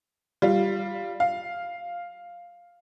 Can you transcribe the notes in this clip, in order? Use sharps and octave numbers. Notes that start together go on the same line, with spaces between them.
G3 F4
F5